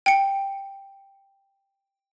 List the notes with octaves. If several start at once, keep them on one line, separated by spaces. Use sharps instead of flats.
G5 C#7